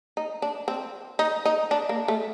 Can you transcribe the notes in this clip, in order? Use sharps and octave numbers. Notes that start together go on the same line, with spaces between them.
D#4
D4
C4
D#4
D#4
D4
A#3
A3